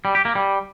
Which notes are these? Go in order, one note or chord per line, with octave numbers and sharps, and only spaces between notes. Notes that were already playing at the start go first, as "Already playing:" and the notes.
G3
G4
A#3
G3